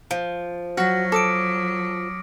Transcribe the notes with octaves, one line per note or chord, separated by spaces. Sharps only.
F3
F#3 F#4 F6 A#6
A4 D6 D#6 D7